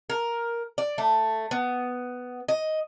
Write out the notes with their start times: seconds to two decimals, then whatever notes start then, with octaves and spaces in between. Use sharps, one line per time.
0.10 A#4
0.78 D5
0.98 A3
1.51 B3
2.48 D#5